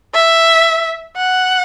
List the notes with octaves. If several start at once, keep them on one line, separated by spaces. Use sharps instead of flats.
E5
F#5